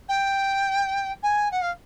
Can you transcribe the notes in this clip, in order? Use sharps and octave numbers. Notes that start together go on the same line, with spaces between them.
G5
G#5
F#5
F5